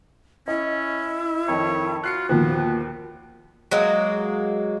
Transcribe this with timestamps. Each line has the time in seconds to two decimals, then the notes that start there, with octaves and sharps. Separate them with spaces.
0.48 C#4 E4 D#5
1.48 F2 D#3 C#5
2.04 F4 F#4 F#6 C7 C#7
2.29 D#2 A#2 D#3 F3 B3
3.71 F#3 G#3 A#3